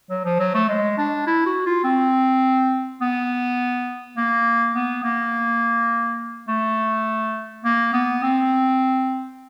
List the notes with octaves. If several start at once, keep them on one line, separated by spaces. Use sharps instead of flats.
F#3
F3
F#3
A3
G#3
D4
E4
F#4
F4
C4
B3
A#3
B3
A#3
A3
A#3
B3
C4